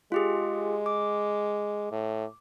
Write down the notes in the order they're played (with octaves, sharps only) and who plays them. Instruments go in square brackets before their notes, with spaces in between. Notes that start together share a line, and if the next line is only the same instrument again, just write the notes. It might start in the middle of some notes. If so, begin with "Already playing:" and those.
[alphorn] G#3 [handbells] F4 G4 G#4
[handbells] D6
[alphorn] A2